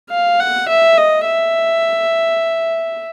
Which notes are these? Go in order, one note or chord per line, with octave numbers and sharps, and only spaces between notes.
F5
F#5
E5
D#5
E5